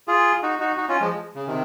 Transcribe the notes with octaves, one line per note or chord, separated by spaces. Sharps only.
F4 G#4
D#4 F#4
D#4 F#4
D#4 F#4
C#4 F4
F3 G#3
C#3
C3 D#3